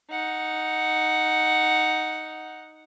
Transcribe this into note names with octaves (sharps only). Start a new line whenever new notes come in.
D#4 F#5